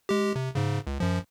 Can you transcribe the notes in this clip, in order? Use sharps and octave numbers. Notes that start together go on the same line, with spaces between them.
G#3 G4
C3
G#2 C#3
C#2
F#2 F3